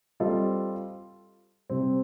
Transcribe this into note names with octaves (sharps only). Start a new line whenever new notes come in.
G3 C4 F4 A4 D#5
C3 G3 C4